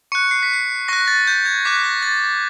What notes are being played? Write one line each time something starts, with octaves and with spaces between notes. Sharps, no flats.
C#6 F#6 C#7
C7
B6
C7
C#6 F#6 A#6
A6
G6
G#6
D6 F#6 B6
A#6
A6